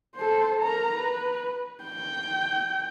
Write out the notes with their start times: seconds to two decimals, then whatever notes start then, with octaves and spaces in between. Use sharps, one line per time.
0.15 A4 C5
0.60 A#4 A#5
0.95 B4
1.84 G5